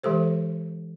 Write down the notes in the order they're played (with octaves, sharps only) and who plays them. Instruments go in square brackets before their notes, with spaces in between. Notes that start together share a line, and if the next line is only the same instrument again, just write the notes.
[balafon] E3 G#3 G4 A4 C5